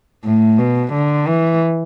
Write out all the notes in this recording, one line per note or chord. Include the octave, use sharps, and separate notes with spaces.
A2
B2
D3
E3